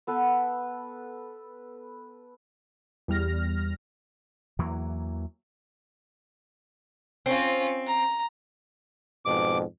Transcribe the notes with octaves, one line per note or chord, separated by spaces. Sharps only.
B3 A4 B4
E2 G3 F6 A#6
E2 E3 F#3 A#3
C4 C#4 F4
A#5
F2 G#2 B2 D6